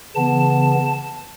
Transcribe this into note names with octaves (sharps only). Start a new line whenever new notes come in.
C#3 E3 B3 A5